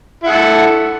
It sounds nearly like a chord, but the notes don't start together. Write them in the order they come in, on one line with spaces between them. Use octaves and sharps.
E4 F#5 A4